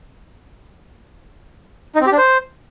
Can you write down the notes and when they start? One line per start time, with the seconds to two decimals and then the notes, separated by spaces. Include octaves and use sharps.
1.95 D#4
2.01 C4
2.07 G4
2.12 D4
2.18 C5